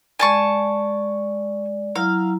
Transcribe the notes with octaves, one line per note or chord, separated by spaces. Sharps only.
G#3 D5 G#5 A5 C#6
F#3 E4 F5 A#5